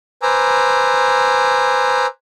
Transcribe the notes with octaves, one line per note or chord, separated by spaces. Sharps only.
B4 C5 G#5 A#5 D6 E6